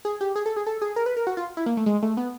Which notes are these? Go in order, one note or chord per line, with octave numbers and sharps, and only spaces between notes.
G#4
G4
G#4
A4
G#4
A4
G#4
A#4
B4
A#4
F#4
F4
E4
A#3
A3
G#3
A3
B3